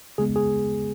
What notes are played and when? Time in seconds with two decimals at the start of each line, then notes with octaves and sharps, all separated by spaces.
0.18 C#3 G#3 B3 G#4
0.36 G#4